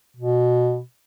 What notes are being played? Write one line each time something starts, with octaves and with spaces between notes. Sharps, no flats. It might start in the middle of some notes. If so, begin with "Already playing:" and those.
B2